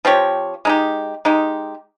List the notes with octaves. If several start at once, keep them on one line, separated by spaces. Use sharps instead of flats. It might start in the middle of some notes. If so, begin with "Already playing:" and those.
F3 C4 G4 C#5
G#3 D#4 G4
G#3 D#4 G4